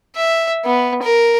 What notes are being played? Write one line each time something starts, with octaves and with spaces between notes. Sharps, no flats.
E5
B3
A#4